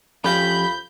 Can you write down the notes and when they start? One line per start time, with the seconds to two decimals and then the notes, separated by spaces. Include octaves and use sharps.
0.24 F2 F3 C#4 G4 F5 A#5 B5 G6